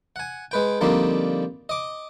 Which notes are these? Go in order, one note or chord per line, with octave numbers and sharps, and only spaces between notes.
F#5 G#5
G#3 B4 G5
D3 F3 G3 A#3 C4 D#4
D#5 D6